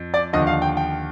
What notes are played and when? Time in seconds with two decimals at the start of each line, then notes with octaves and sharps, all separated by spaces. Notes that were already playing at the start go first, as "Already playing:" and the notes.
Already playing: F2
0.14 D5
0.33 D#2 D3 F3 D#5
0.47 F5
0.62 G5
0.77 G5